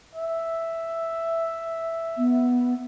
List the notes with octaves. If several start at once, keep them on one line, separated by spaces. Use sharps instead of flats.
E5
B3